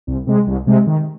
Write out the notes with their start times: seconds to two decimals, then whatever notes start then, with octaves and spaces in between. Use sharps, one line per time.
0.07 C2
0.27 C3 G#3
0.47 C2
0.67 C3 G#3
0.87 D#3